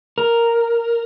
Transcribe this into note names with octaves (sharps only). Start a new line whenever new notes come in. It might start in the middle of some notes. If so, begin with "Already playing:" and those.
A#4